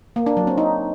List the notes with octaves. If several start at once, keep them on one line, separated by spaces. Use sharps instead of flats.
A#3
D4
F#3
C4
D#4